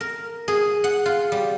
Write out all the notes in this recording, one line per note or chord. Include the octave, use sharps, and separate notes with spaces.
A#4
G#4
F#5
F4
G3